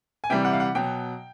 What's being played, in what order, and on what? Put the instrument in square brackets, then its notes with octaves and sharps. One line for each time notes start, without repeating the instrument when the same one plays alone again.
[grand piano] G#5
C3 E3 G3 G5
F#5
F5
F#5
B2 F#3 G5